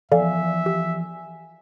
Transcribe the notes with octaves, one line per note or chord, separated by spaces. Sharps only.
E3 F3 B3 A4 D5 E5 F5 G#5
G4